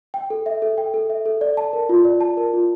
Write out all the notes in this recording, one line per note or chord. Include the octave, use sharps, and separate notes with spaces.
G5
A4
E5
A4
G5
A4
E5
A4
D5
A5
A#4
F4
D5
A5
A#4
F4